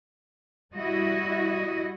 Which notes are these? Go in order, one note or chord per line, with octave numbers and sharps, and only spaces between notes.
G3 E4 F#4 D#5